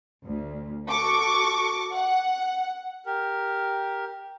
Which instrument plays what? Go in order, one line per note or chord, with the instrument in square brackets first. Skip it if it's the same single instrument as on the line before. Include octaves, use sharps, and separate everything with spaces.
[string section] D2
F#4 A4 C#6 D6
F#5
[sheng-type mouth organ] G4 A#4